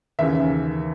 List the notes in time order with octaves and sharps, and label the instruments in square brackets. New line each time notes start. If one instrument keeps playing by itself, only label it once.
[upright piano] D#2 C#3 E3 E5